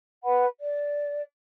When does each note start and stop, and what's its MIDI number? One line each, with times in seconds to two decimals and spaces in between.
0.24 0.45 71
0.24 0.45 78
0.24 0.45 83
0.59 1.21 74